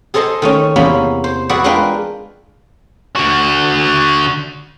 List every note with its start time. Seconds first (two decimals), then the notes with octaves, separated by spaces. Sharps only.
0.14 G#4 A4 C5 D#5 A5
0.42 D#3 A3 C#4
0.76 E2 C3 A#3 C#4 B5
1.24 C5
1.49 F#4 G#4 B4 D5 E5 F#5
1.64 G#3 D4 F4 A#4 B4 G5
3.16 D3 F#4